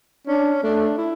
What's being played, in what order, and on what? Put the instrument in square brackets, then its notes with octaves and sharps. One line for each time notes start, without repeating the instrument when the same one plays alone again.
[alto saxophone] C#4 [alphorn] D4
[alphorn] A3 [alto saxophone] D4
[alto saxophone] E4